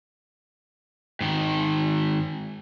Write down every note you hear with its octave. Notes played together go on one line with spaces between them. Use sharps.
G#2 D#3